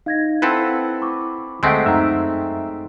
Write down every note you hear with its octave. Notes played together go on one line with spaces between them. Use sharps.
D#4 F5 G#6 A#6
C4 E4 A4 B4 F#5
B5 C#6 D6
D2 G#3 A3 C4 F#5 E6 B6 D7
F#2 D#4 E5 G5 A#5 E6